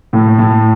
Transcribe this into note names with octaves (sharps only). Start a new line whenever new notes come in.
A2
A2